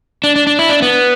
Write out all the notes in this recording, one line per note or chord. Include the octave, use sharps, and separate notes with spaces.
D4
D4
D4
E4
D4
B3